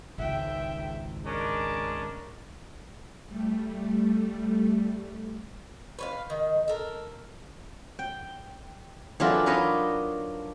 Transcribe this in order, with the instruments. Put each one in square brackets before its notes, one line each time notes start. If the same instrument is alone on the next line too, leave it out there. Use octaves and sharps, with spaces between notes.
[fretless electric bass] G#1 C#2 G#2 [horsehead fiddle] E5 G5
[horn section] G#3 C#4 D4 [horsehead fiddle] A#4
[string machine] G3 A3
[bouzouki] B4 C#5 F5
D#3
A4 A#4
[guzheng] G5
E3 F#3 D4 F4 A4 A#4
D4 D#4 A#4 B4 C#5 D#5